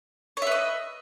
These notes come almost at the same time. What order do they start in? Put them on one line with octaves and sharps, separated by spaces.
C#5 E5 B4 D#5